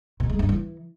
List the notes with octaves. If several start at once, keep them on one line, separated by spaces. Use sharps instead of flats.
B2
G#3
G2
E3